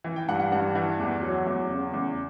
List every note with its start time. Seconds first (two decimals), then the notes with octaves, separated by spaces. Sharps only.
0.04 E3
0.16 G5
0.28 G2 F#5
0.40 F#5
0.52 G2 F#5
0.75 E3
1.00 E2
1.22 F#3
1.47 E2
1.70 C#3
1.94 E2